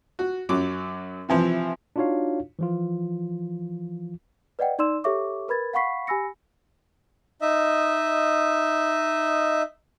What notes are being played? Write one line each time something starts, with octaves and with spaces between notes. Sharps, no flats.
F#4
F#2 F#3 D6
C3 E3 F3 C4
D4 D#4 F4 F#4 C#5 F5
E3 F3 F4
B4 D5 D#5 F#5 G5
D#4 D5 C6 E6 E7
G4 A4 C#5 E5 C#6 D6
A#4 B4 B5 G#6 A6
F5 F#5 B5 C#6 B6 C7
G4 G#5 B5 E6 A#6 C#7
D#4 D#5 E5